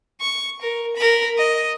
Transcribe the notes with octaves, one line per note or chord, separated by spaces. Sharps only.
C#6
A#4
A#4 B5
D#5